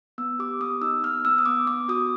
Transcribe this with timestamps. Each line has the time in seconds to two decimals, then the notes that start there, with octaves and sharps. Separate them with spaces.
0.18 B3 E6
0.39 G4 D6
0.60 B3 D#6
0.82 D#4 E6
1.03 B3 F6
1.25 B3 E6
1.38 D#6
1.46 B3 D6
1.67 B3 D6
1.88 F#4 D#6